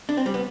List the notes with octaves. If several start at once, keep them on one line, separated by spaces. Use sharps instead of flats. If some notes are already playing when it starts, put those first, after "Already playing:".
D4
C4
G3
B3